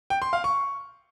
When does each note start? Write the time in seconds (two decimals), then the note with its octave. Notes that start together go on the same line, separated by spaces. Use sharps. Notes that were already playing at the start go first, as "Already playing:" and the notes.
0.10 G5
0.22 C6
0.33 F5
0.44 C#6